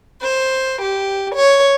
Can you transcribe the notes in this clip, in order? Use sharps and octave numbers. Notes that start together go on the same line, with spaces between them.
C5
G4
C#5